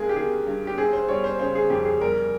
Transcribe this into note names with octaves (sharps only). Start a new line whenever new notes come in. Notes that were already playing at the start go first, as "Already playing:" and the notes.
Already playing: G2 G#3 G#4 A#4
G4
D#3 G#4
G2
G4
C4 G#4
C5
G3 C#5
C5
C#3 C5
G#4
F2 G4
G#4
G3 A#4